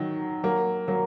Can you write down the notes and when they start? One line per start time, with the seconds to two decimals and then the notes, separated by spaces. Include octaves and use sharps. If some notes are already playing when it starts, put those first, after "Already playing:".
Already playing: D#3 F#3
0.43 F#3 A#3
0.88 F#3 A#3